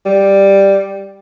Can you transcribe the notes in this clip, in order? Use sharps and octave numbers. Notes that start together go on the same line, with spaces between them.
G3